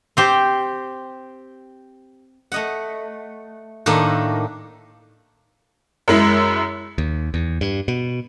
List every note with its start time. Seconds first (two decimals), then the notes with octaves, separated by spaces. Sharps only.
0.17 C4 G4 C5
2.52 A3 D#5 F#5
3.86 A2 D#3 A#3 D4 A4 A#4
6.08 F#2 G#3 E4
6.98 D#2
7.34 E2
7.61 G2
7.88 B2